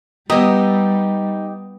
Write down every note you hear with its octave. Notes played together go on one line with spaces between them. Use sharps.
G3 B3 D#4 G4 E5 A#5 D#6